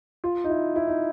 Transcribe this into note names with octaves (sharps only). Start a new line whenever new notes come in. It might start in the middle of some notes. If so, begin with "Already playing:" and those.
F4
D#4
E4
E4
D#4